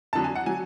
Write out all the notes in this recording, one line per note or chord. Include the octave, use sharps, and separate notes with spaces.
F2 D3 F#3 A5
G#5
F#5
F#3 G#5